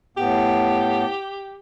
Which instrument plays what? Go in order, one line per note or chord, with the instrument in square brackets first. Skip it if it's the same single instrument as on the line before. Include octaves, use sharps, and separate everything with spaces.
[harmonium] A2 B3 [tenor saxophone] G4